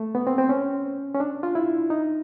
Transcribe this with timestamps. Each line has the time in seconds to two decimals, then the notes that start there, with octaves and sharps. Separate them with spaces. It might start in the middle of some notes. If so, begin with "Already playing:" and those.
Already playing: A3
0.15 B3
0.27 C4
0.38 C4
0.49 C#4
1.14 C#4
1.20 D4
1.43 F4
1.55 E4
1.90 D#4